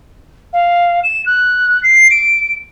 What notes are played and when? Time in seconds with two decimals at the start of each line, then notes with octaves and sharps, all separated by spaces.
0.53 F5
1.03 E7
1.25 F#6
1.82 C7
2.10 D7